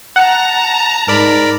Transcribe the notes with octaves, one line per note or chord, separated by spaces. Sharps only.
F#5 A5 A#5
G#2 A#4 D5 B5